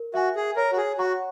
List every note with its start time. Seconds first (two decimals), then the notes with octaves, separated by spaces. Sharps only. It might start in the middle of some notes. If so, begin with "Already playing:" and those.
Already playing: A#4
0.14 F#4 E5 G#5
0.36 G#4
0.56 A#4 C#5
0.72 F#4
0.78 G#4
0.98 F#4 F#5 A#5 C#6